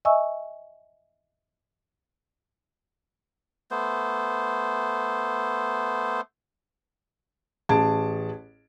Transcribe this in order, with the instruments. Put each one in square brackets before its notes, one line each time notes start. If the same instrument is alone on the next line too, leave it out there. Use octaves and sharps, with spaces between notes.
[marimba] D#5 E5 G#5 C#6 E6
[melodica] A3 B3 C5
[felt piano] A1 G#4 A5 D7